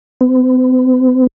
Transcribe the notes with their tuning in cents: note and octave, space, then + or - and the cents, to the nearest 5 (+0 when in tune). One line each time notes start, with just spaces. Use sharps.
C4 -45